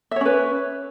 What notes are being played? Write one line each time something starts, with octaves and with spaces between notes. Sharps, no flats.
C#4 B4 C#5 E5